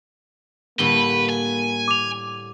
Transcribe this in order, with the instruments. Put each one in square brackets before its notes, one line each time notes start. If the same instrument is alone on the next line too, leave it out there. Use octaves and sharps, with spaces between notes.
[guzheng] A2 D3 G3 [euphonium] A#3 [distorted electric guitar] B4 [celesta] G7
[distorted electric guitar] G#5
[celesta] D6 F7